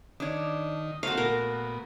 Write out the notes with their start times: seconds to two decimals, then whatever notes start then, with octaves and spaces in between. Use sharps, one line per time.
0.20 D#3 D4 D#4 C#5
1.03 A3 A#3 C4 F#4 F5
1.18 A#2 B3 A#4